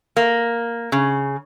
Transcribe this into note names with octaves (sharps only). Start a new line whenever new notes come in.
A#3
C#3